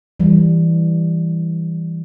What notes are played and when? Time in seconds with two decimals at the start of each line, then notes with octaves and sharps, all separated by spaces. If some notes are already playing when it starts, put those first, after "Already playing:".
0.20 E3 G3